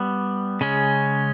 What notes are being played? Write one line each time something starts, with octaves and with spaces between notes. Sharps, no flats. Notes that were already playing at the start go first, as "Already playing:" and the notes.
Already playing: G3 B3
C#3 G#3 C#4